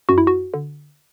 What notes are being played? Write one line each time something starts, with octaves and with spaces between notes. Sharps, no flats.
F#2 F#4
E4
F#4
D3